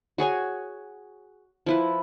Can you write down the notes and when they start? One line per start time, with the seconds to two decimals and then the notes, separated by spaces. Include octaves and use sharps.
0.18 F#4 G#4 C#5 G#5
1.66 F3 E4 B4